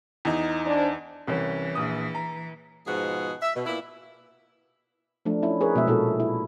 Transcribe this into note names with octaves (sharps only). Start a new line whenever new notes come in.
E2 D#4
D4 C5
C2 E3 C#4
A#1 D#6
A#5
G#2 B2 F3 G#4 F#5
E5
B2
A#2 B3 E4
F3 A3 D4
C#4 E4
G#4 A#4 B4 C#5
B2 G#3 E5
A#2 E4 F#4 A4
E4